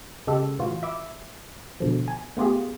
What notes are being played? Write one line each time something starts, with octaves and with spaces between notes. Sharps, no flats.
C#3 G#3 G4 A4
A2 E3 F4 F#4
E5 B5 D6
B2 D3 F3
G#5
A3 B3 F4 G4 G#4